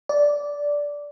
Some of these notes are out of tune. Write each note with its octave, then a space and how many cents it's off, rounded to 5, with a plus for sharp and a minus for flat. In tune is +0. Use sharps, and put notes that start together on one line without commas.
D5 -10